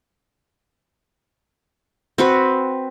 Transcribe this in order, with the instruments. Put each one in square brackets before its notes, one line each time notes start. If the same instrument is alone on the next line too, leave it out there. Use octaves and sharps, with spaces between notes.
[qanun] C4 F#4 B4